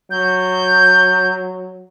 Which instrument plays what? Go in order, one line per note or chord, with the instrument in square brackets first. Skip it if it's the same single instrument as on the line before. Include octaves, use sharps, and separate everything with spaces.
[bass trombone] F#3 [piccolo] G6